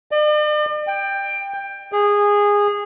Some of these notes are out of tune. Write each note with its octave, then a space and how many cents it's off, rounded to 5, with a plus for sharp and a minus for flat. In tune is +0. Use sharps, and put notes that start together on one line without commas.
D5 +45
G5 +15
G#4 -15